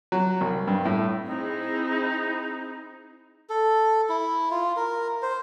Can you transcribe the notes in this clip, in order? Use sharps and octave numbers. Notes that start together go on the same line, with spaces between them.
F#3
C2
G2
A2
C4 D#4 E4 G#4
A4
E4
F4
A#4
C5